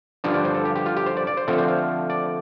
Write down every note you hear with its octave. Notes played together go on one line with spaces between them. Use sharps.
G2 D3 F3 D4 C5
F5
D5
C5
A4
G4
G4
F4
G4
C5
D5
D5
C5
D3 F3 A3 C4 A4
C5
F5
D5